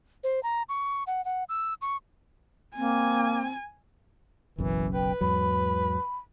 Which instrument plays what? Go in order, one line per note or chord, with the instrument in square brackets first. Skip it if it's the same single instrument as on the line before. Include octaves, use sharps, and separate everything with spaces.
[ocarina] C5
A#5
C#6
F#5
F#5
E6
C#6
[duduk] A#3 [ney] C4 [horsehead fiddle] G#5
[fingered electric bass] F#1 B1 F#2 [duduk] E3
[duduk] B4 [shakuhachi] G5
[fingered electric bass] E2 G#2 F#3 [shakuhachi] B5